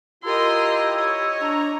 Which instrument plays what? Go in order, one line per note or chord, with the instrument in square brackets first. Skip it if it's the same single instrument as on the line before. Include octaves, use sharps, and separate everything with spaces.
[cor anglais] E4 [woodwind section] F4 G4 [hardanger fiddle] A#4 D#5 [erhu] C6
[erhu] C#5 [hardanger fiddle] D#5
[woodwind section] D4 A#5